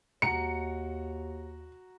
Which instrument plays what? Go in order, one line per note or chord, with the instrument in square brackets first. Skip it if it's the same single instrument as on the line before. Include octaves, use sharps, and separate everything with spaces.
[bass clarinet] D#2 [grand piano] F#4 A#5 [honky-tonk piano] C#7